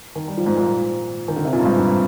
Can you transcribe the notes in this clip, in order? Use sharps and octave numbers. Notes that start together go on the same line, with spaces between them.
D#3
G3
F3
G#2
A#2
D#3
D3
C3
A#2
G2
G#2
G2